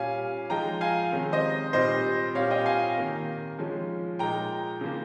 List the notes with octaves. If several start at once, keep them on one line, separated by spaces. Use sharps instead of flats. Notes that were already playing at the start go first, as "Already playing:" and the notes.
Already playing: A#2 G3 C#4 F5 G#5
F3 G#3 D#4 G5 A#5
F5 G#5
C3 D#3 G#3 C#4
C5 D#5
A#2 G3 C4 D#4 C5 D#5
A#2 G3 C4 C#5 F5
D#5 G5
F5 G#5
C3 D#3 A#3
F3 G#3 C#4
A#2 G#3 D#4 G5 A#5
C#3 F3 A#3